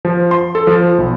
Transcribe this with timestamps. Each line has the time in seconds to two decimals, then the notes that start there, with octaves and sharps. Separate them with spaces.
0.05 F3
0.31 C6
0.55 A4
0.67 F3
0.98 B1